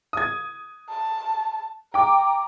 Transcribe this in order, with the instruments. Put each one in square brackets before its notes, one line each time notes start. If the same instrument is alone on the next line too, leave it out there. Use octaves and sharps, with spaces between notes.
[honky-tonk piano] D#6 G#6
[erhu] A5
[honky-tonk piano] G5 D6 [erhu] A#5